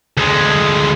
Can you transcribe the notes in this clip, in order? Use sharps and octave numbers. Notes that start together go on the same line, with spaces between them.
D2 G#3